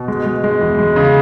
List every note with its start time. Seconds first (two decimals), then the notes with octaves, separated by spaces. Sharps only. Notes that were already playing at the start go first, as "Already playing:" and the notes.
Already playing: B2
0.08 G#3
0.26 G#3
0.44 G#3
0.61 E2
0.79 G#3
0.96 C#3